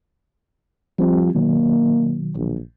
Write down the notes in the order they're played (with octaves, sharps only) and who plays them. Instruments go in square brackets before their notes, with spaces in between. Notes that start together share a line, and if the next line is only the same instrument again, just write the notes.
[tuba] F3 [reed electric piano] G3 C4 G4
[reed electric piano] B2 D#3 F#3 [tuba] A#3
[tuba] A#1